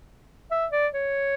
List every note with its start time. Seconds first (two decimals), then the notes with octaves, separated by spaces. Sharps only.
0.51 E5
0.72 D5
0.94 C#5